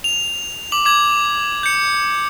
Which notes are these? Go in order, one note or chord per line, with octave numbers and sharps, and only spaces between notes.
F7
D6 F#7
D6 G#6 F#7
G6 C#7